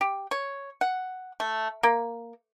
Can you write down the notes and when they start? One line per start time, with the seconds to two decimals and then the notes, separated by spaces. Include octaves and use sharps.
0.01 G4
0.31 C#5
0.81 F#5
1.40 A3
1.83 A#3